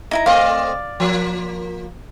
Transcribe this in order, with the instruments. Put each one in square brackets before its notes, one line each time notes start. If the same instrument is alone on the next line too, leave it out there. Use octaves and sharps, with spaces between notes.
[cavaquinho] D#4 E4 A#5
[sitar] A3 C4 D#5 [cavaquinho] D5 F5
[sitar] F3 A#3